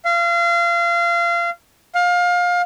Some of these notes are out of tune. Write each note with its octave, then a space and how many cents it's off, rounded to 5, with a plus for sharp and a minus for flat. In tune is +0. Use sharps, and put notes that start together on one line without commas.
F5 -30
F5 +25